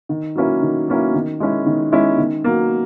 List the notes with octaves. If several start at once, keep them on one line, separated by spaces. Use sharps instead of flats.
D#3
F#3 A#3 C#4 E4
D#3
F#3 A#3 C#4 E4
D#3
G#3 C#4 E4
D#3
G#3 C#4 E4
D#3
F#3 A#3